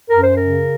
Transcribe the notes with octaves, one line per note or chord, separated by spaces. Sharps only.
F#2 A#4
C5
C#3 A#4